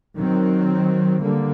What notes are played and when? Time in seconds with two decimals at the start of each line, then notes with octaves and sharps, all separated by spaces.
0.17 D#3 F#3 C4
1.22 D3 G3 A#3